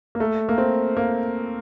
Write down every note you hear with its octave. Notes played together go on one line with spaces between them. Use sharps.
A#3
A3
A#3
C4
A#3